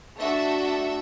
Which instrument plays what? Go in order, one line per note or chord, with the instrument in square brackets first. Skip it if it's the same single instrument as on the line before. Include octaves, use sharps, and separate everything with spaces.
[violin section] A3 D4 F#4 A4 E5